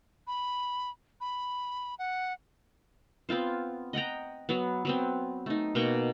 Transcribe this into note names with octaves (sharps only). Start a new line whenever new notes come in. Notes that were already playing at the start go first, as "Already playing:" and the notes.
B5
B5
F#5
B3 C4 F4 C5
D#5 F#5 G5 A#5
F#3 B3
F#3 B3 C4
A3 D#4
B2 A#3 G5 C#6